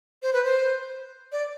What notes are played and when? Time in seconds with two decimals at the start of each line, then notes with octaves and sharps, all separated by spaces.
0.23 C5
0.33 B4
0.44 C5
1.32 D5